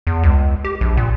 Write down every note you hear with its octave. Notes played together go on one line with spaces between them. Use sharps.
E2
C#2
G4
A#1
A#2